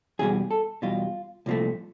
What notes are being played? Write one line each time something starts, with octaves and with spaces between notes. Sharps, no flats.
E2 B2 G3 G#4
A4
E2 B2 G3 F4
C2 A#2 F3 A3